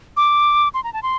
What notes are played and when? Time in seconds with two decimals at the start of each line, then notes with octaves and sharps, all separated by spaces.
0.17 D6
0.74 C6
0.84 A#5
0.93 A5
1.03 C6